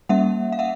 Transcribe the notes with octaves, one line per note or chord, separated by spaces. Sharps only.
G3 A#3 C#4 E5 F#5
F5
E5 F#5